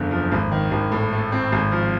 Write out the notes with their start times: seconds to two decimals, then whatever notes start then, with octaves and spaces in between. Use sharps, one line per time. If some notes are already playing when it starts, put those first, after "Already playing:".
Already playing: F#1 E2 D3
0.11 F3
0.32 G#1
0.52 D#3
0.71 G#1
0.92 A2
1.13 A3
1.32 C4
1.52 G#1
1.72 F3